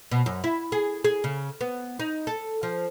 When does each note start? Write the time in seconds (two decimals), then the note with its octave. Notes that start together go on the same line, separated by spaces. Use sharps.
0.11 B2
0.26 F#2
0.44 E4
0.72 G#4
1.05 G#4
1.24 C#3
1.61 B3
1.99 D#4
2.27 A4
2.63 F3